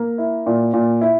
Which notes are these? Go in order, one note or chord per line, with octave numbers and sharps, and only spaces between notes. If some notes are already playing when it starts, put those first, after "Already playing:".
Already playing: A#3
E4
A#2
A#2
E4